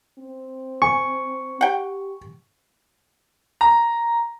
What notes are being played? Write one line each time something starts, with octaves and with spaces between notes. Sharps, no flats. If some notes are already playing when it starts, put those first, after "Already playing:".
C4
G#5 C#6
G4 F#5 G5
A#5